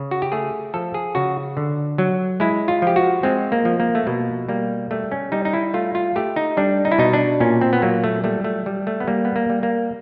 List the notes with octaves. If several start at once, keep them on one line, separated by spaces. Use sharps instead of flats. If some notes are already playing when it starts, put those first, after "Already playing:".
Already playing: C#3
F#4
G4
A3 G#4
F3 A4
G#4
C#3 F#4
D3
F#3
G#3 E4
F4
F3 G4
F#4
G#3 C4
A#3
F3
A#3
A3
B2 A#3
G3 A#3
G3 A3
C#4
G3 D#4
D#4
E4
A3 F4
F4
A3 G4
D#4
G3 D4
D#4
E4
B2 D#4
D4
A#2 C#4
C4
B3
F#3 A#3
A3
G3 A3
A3
G3
A3
B3
G3 A#3
B3
A#3
G3
A#3